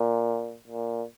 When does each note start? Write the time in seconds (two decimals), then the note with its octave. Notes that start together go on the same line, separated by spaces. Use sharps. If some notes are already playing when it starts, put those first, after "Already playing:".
Already playing: A#2
0.67 A#2